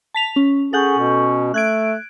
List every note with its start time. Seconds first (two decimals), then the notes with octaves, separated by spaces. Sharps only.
0.14 A5 B6 F7
0.36 C#4
0.73 C#4 G#4 A4 F#5 G6
0.98 B2
1.54 A3 F#6 G#6 D7